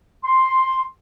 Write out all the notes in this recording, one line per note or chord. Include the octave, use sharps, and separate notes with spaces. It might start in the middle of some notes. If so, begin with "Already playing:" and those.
C6